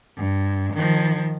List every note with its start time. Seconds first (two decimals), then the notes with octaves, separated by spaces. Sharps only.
0.17 G2
0.74 D#3 F3